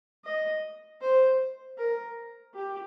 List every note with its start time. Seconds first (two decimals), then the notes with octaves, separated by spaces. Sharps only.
0.24 D#5
1.01 C5
1.78 A#4
2.54 G4